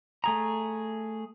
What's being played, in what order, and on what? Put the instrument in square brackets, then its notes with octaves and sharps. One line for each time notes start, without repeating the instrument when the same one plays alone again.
[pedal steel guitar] A3 G#4 A#5